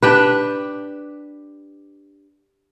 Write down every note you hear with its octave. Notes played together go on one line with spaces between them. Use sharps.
D4 G4 B4